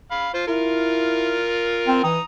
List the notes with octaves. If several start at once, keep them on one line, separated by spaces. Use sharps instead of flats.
F5 B5
F4 C5
E4 F4 A#4
C4
E3 A#5 D#6